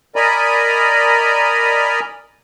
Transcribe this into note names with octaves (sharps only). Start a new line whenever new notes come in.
A#4 D5 D#5 G#5 A#5 B5